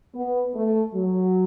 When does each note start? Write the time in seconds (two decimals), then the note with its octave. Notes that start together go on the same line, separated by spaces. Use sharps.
0.15 B3
0.54 A3
0.94 F#3